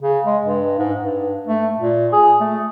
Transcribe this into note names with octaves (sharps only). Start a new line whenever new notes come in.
C#3
G#3
G2
G#2
G2
A3
A#2
G#4
A3